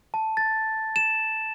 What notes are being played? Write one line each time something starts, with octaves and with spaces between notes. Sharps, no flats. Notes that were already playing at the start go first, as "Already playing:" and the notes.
A5
A6
E7